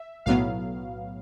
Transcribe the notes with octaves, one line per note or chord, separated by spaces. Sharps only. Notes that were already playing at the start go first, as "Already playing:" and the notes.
Already playing: E5
B1 A2 F#3 B3 F5